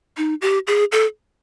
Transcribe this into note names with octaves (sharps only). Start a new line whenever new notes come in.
D#4
G4
G#4
A4